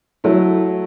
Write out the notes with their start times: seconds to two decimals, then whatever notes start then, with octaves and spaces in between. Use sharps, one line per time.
0.24 F#3 A3 E4